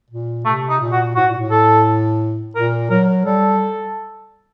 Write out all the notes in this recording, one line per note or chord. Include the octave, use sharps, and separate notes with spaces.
A#2
C3 A3
D#4
A#2
F#4
A2 F#4
A#2
A2
A4
A#2 A#4
F#3 A#4
G3 A4